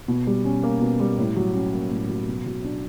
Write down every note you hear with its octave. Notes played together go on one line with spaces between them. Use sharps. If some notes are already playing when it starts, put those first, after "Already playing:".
B2
G3
C#4
A#3
B2
G3
A2
F#3
C#4
A#3
A2
F#3
B2
F#3
D4